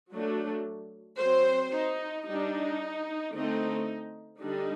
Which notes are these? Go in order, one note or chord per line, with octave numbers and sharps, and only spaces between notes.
F#3 A3 D4
F#3 C4 C5
D#4
G3 D4 D#4
D3 A3 C4 D#4
D3 G3 D4 D#4